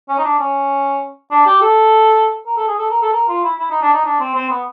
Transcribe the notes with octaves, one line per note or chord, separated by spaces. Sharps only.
C#4
D#4
D4
C#4
D4
G4
A4
A#4
A4
G#4
A4
A#4
A4
A#4
F4
E4
E4
D#4
D4
D#4
D4
C4
C4
B3